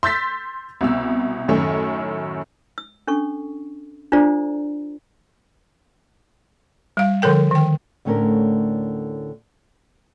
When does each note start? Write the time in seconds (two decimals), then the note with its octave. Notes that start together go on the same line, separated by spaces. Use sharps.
0.03 C6 E6 G6 A6 B6
0.81 C2 B2 E6
1.48 F#2 A2 D#3 A3 C#4
2.78 E6
3.07 C#4 D4 A4 C#6
4.12 D4 F4 A4 C5 D5 A#5
6.97 G3 F5
7.22 D3 F3 A4 A#4 G5
7.51 D#3 G5
8.05 D2 A2 D3 A3 C#4 A#4